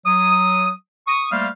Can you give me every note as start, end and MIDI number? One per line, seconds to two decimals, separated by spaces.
0.06 0.72 54
0.06 0.72 87
1.08 1.29 85
1.08 1.29 87
1.32 1.48 55
1.32 1.48 57
1.32 1.48 58
1.32 1.48 72
1.32 1.48 77